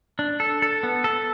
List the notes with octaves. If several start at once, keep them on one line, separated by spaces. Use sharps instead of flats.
D4
A4
A4
B3
A4